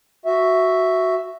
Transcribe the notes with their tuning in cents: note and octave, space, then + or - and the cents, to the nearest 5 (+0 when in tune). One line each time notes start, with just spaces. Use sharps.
F#4 +0 E5 +0